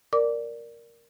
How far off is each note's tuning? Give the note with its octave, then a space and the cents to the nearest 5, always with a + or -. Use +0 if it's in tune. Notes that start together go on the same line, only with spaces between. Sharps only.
A#4 +0 D5 +0 D6 -20